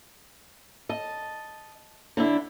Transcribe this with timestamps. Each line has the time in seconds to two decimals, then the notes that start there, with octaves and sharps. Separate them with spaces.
0.89 D#5 A5
2.17 D3 D4 E4